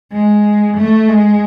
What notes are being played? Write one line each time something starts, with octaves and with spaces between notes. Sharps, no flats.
G#3
A3
G#3